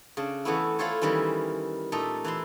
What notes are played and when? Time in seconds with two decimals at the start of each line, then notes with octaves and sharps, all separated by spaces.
0.17 C#3 D4
0.45 E3 A3 B3 C#4 E4
0.79 E4 F4 A4 C5 C#5
1.02 D#3 E3 G3 C#4 E4
1.92 A#2 A3 D#4 A4
2.25 E3 E4 C6